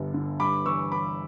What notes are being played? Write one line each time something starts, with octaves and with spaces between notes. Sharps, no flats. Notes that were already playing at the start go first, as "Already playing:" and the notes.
Already playing: G1 G2 D3
D3
G2 B5 D6
E3 C#6 E6
E3 B5 D6